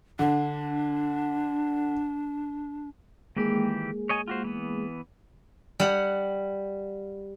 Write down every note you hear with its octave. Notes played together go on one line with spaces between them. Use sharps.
D3 D4
D#3 E3 G#3 A#3 G4 G#4
C#5 D#5 G#5
F4 F#4 C5
E3 B3
G3 F#5